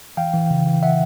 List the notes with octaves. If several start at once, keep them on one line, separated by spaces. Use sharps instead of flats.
E3 F5 G5
E3
C#3
E3
E5 F#5